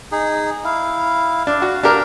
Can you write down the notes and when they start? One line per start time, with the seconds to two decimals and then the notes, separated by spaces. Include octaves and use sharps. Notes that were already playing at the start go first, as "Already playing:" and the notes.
0.12 D#4 G#4
0.64 E4 F5
1.47 D4 F5
1.62 F#4
1.83 D4 G4 A#4